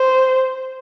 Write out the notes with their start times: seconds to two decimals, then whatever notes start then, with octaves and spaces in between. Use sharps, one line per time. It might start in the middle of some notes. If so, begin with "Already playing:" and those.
Already playing: C5